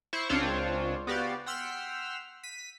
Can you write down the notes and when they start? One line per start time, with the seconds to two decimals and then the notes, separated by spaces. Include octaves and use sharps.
0.13 E4 C5 C#6
0.29 C#2 C4 D4 F4 C5 C#5
1.07 B3 F#4 G4 D5 F5
1.46 F#5 G5 C6 E6 F6 B6
2.43 B6 D#7